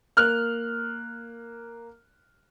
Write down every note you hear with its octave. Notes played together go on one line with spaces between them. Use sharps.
A#3 F6 F#6